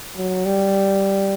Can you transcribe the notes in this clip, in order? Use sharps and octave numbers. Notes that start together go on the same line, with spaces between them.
F#3
G3